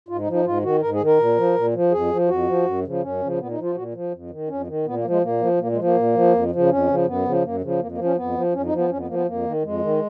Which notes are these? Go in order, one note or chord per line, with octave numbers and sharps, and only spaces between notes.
G#2 F4
D#4
F3
D#4
G#2 F4
D#3 F#4
G#2 A#4
G#4
D#3
A#4
A#2
F3
A#2
F3
F2 G#4
F3
F2 F#4
F3
F#2
C#3 F3
F#2 C#4
C#3 F3
A#2 B3
D#4
F3
F4
A#2 F#4
F3
F2
D#3
F2 C#4
D#3
A#2 B3
A#3
F3
G#3
A#2 A#3
F3
A#2 A#3
G#3
F3
A#3
A#2
F3
F2
C#3 F3
F2 C#4
C#3 F3
F#2 B3
C#3 F3
F#2 A#3
C#3 F3
F2 A#3
A#3
F3
C#4
F2 B3
F3
F2 C#4
D#4
F3
B3
F2 C#4
B3
F3 A#3
B3
F2 A#3
D#3
F2 G#3
D#3